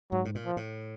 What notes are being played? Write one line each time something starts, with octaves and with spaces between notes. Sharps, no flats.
G#2 F#3
A2
A#2
F3
A2